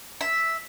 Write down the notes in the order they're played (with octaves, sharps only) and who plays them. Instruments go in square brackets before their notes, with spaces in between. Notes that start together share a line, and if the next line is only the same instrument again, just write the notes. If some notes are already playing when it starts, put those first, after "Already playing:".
[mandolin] E5